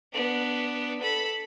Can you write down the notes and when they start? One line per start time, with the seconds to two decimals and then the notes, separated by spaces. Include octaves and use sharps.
0.13 B3 D4
1.01 A4 B5